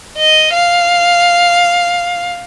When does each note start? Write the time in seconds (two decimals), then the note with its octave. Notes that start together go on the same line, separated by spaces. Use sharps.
0.18 D#5
0.54 F5